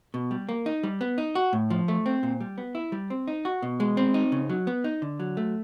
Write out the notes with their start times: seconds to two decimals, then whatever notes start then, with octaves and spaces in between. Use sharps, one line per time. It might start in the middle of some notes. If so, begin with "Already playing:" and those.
0.14 B2
0.31 G3
0.49 A#3
0.66 D#4
0.83 G3
1.01 B3
1.18 D#4
1.35 F#4
1.53 A2
1.70 F3
1.88 A3
2.06 C4
2.23 A#2
2.41 G3
2.58 B3
2.75 E4
2.92 G3
3.10 C4
3.28 D#4
3.45 F#4
3.63 B2
3.80 G#3
3.97 C4
4.14 D#4
4.32 C#3
4.50 F#3
4.67 B3
4.84 D#4
5.02 D3
5.20 F#3
5.37 A3